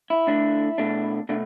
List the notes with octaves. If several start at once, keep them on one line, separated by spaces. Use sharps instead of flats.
E4
D3 A3 D4
B2 A3 D4
B2 A3 D4